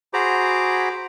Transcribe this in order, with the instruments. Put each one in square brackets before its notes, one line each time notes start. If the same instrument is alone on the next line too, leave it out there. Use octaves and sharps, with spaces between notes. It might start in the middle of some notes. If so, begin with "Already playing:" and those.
[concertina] F#4 G#4 C5 A#5 B5 D6